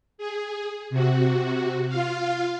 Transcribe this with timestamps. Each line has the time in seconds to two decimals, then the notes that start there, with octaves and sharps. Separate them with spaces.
0.18 G#4
0.90 C3 F#4
1.89 F4 F5